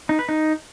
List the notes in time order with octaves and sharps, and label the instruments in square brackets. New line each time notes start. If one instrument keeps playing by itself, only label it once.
[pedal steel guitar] D#4
B4
D#4